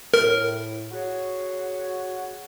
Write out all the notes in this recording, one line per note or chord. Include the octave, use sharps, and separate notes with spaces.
A2 A#4
F#4 G#4 C#5